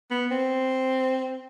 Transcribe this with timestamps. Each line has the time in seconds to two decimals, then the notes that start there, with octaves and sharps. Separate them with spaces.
0.11 B3
0.31 C4